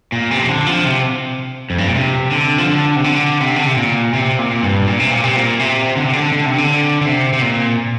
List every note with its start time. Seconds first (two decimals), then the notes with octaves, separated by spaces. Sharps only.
0.12 A#2
0.31 C3
0.40 F3
0.49 D3
0.66 F3
0.85 C3
1.70 F2
1.78 G2
1.86 A#2
1.95 C3
2.31 D3
2.58 F3
2.67 D3
2.96 C3
3.04 D3
3.41 C3
3.56 D3
3.67 C3
3.78 A#2
4.13 C3
4.39 A#2
4.63 G2
4.86 A#2
4.99 C3
5.11 A#2
5.24 C3
5.36 A#2
5.59 C3
5.96 D3
6.05 C3
6.13 D3
6.32 D3
6.46 C3
6.58 D3
7.01 D3
7.06 C3
7.33 C3
7.42 A#2